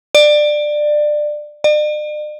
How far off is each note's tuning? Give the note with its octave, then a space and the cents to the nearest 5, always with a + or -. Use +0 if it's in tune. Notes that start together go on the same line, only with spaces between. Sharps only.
D5 +20
D5 +45